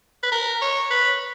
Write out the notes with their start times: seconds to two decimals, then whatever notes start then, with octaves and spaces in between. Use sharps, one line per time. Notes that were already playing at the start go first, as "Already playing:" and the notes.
0.23 B4
0.32 A#4
0.62 C#5
0.91 B4